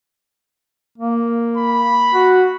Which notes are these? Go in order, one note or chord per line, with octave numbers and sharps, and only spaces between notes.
A#3
B5
F#4